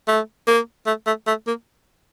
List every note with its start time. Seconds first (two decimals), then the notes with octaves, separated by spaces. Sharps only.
0.08 A3
0.47 A#3
0.87 A3
1.06 A3
1.27 A3
1.47 A#3